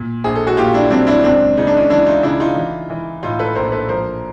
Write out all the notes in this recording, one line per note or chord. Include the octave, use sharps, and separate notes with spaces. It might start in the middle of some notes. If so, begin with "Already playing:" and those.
Already playing: A#2
A#1 G#4
A4
F#4 G#4
A#2 F4 G4
D4 E4
F#3 C4 D4
D4 E4
C#2 C4 D4
C#3 D#4
D4
C#4 D#4
E3 D4 E4
D#4 F4
C#3 D4 E4
D#4 F4
E3
E3
A2 D#4 F4
A4 B4
A#1 A#4 C5
A4 B4
F3 A#4 C5